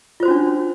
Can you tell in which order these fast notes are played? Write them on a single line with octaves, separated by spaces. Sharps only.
F4 C5 F#4 C#4 D4